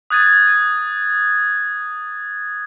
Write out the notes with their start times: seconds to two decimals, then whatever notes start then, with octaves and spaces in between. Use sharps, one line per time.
0.10 D#6 F#6 G#6 A6 D#7